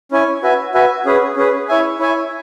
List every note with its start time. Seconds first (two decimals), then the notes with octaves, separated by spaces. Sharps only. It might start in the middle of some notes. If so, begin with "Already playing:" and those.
0.11 C#4 E4 C#5 G#5
0.43 F#4 B4 E5 G#5
0.74 F#4 B4 E5 G#5
1.05 C#4 G#4 B4
1.36 C#4 G#4 B4
1.68 E4 C#5 E5 G#5
1.99 E4 C#5 E5 G#5